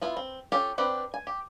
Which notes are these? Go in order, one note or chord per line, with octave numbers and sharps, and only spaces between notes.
B3 E4 F4
C4
C#4 F4 G4 A4 F5
C4 D4 G4 B4 F#5
G#5
G4